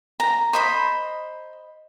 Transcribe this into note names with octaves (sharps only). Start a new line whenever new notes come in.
A#5
C5 D#5 B5